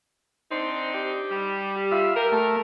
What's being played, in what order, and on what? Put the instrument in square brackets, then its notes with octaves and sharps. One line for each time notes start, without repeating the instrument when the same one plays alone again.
[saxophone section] C4 D4 D#4 [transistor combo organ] C5
[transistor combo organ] G4
[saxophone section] G3
[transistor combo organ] F4 E5
[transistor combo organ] G4 [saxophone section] A#4
[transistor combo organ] A3